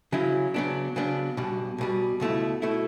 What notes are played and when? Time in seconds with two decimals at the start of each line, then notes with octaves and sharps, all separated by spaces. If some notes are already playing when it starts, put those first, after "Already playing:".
0.12 C#3 F#3 C#4 E4
0.54 C#3 F#3 B3 D4
0.96 C#3 F#3 B3 D4
1.37 B1 B2 G3
1.78 B1 B2 G3
2.20 C#2 B2 A3 E4
2.62 B2 A3 E4